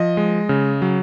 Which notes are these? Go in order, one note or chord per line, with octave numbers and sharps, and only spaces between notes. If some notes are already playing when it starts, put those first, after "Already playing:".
Already playing: F3 D#5
G#3
C#3
F#3